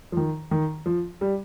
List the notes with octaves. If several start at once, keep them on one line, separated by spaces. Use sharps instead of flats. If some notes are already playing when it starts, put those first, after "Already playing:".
F3
D#3
D#3
F3
G3